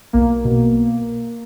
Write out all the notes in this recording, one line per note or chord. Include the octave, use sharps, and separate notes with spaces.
B1 A#3
B2